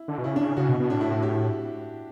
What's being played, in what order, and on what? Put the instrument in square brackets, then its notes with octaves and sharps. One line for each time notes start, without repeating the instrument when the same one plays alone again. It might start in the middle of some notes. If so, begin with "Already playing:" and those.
Already playing: [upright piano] E4
[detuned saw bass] D3
B2
[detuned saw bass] C#3 [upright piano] E4
[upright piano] D4
[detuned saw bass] C#3
[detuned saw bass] C#3 [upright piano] F#4
[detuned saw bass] B2
B2
[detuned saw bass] A2 [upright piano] D4
[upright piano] E4
F#4
G4